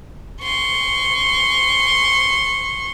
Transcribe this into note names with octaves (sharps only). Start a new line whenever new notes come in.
C6 C#6